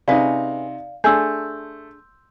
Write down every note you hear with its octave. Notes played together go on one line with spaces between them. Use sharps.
C3 C#4 D#4 G#4 B4 D5 F5
A3 D4 G#4 C6 E6 G6